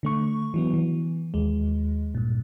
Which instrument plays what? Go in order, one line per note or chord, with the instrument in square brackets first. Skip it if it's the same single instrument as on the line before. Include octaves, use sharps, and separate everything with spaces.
[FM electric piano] D3 A3 C#6
E3 F#3 B3
E3
D#2 G#3
G2 A#2